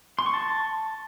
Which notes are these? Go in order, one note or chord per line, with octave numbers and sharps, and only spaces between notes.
C6
C#6
A5